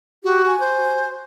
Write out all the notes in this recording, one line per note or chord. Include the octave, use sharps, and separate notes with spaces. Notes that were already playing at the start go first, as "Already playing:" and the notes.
F#4 G4
G#5
C5